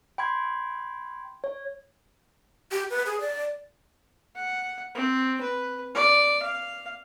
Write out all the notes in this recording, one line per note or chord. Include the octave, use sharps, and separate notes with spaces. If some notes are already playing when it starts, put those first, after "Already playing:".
G5 B5 C6 G#6
C#5
G4
B4
G#4
D5
F#5
C4
B4
D5
F5